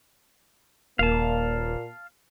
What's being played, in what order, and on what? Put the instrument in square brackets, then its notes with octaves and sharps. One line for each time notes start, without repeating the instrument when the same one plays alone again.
[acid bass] D#1 [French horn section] A#2 A#3 [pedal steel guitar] F5 A5